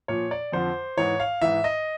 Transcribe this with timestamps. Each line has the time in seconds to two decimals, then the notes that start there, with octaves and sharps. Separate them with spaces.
0.08 A#2 F3 C#5
0.31 D5
0.52 F2 D3 F3 C5
0.97 G#2 E3 C#5
1.20 F5
1.42 G#2 E3 E5
1.64 D#5